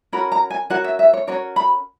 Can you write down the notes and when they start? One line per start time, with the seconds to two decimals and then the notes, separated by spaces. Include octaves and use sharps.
0.13 C#4 F#4 A#4 B5
0.32 A#5
0.51 G#5
0.70 C#4 F#4 A#4 F#5
0.84 E5
0.99 E5
1.13 C#5
1.27 C#4 F#4 A#4 C#5
1.56 B5